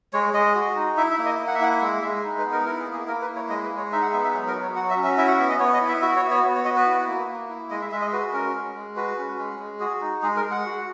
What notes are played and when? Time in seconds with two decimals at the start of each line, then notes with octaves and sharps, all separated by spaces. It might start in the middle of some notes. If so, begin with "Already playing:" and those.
0.13 G#3 C#5
0.34 G#3 D#5
0.55 F#4
0.76 D#4
0.97 E4 E5
1.11 E5
1.18 A#3
1.25 D#5
1.40 A#3
1.47 F#5
1.55 E5
1.61 E4 F#5
1.81 G#3 E5
2.02 G#3 E5
2.23 D#4
2.38 B4
2.45 B3
2.52 A#4
2.65 E4 A#4
2.79 G#4
2.86 A#3
2.93 G#4
3.07 A#3 A#4
3.22 B4
3.29 E4
3.36 C#5
3.49 G#3 D#5
3.63 B4
3.71 G#3
3.77 C#5
3.92 D#4 E5
4.02 F#5
4.13 B3 E5
4.24 E5
4.33 F#3 G#4
4.47 A#4
4.55 F#3
4.62 C#5
4.75 F#4 F#5
4.90 E5
4.97 C#4
5.04 E5
5.18 E4 E5
5.28 F#5
5.39 B3 E5
5.49 D#5
5.60 B3 C#5
5.73 D#5
5.81 E4
5.88 E5
6.02 F#4 E5
6.16 C#5
6.23 B3
6.30 C#5
6.44 B3
6.55 C#5
6.65 F#4 D#5
6.76 B4
6.86 E4
7.07 A#3
7.28 A#3
7.49 E4
7.70 G#3 D#5
7.81 E5
7.92 G#3 E5
8.01 D#5
8.13 F#4 B4
8.33 C#4 A#4
8.54 G#3
8.75 G#3
8.96 F#4 B4
9.18 C#4
9.38 G#3
9.59 G#3
9.80 F#4 G#4
10.01 D#4
10.22 G#3 G#4
10.36 A#4
10.44 G#3
10.51 F#5
10.65 F#4